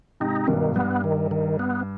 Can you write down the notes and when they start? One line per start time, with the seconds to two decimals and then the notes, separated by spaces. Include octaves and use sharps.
0.20 G#2 C3 D#4
0.48 G2 B2 D#3
0.66 G#2
0.76 G2 B3
1.04 D#3
1.31 D#3
1.59 B3